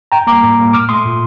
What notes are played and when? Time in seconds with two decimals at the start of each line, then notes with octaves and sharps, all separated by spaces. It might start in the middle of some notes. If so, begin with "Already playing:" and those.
0.12 A2 G5 A#5
0.27 G3 A#3 A#5 D6
0.43 A2
0.59 G3 A#3
0.73 A#2 D6 F6
0.89 A3 C6 D#6
1.05 A#2